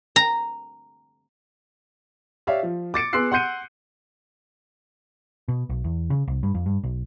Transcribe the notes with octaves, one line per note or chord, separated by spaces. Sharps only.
A#5
G4 C#5 D5 E5 F5
F3
D6 A6 C#7 D7
B3 G#4 C6 E6 F#6 C7
F#5 C6 F#6 G6 C#7 D#7
B2
B1
E2
C#3
C2
G2
F2
G2
B1